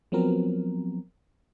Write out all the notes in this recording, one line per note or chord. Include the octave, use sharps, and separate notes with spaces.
F3 F#3 B3 C4 A#4